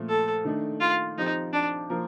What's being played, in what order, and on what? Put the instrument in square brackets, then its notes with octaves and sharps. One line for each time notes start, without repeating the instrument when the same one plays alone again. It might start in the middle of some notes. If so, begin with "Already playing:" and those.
Already playing: [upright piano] A#2 F3 A3
[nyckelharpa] A4
[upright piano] D#3 A3 D4
[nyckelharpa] F4
[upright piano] F3 C4 G4 [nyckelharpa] D#4
[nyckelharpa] D4
[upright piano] F3 A#3 F4 A#4